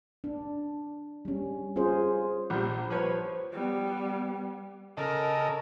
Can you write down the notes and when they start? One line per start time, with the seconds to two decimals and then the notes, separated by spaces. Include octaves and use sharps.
0.24 D4
1.25 G3 C#4
1.76 C#4 F4 G#4 C5
2.50 A#1 G3
2.90 F3 B4 C#5
3.53 G3 B3
4.97 C#3 A4 A#4 D#5